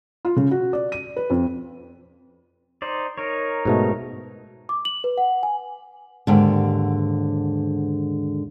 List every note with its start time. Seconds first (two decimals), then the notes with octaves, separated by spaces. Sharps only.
0.25 F4
0.36 C#3
0.51 F#4
0.73 D5
0.92 D#7
1.16 B4
1.30 F2
2.82 D#4 C5 D5
3.17 D#4 A#4 C#5
3.65 G#2 B2 A3
4.69 D6
4.85 F#7
5.04 B4
5.17 F#5
5.43 G#5
6.27 D#2 G#2 D3